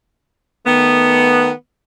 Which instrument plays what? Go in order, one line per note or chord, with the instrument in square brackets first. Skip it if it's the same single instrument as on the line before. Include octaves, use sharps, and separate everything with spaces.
[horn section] D#3 A3 B3